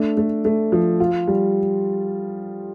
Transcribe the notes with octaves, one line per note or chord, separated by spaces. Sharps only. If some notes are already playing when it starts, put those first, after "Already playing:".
Already playing: A3 D4
A3
A3
F3
F4
G3